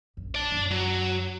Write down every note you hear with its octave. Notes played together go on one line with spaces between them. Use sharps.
A#1 F#2
D5 A5
F#2 C#3
F#3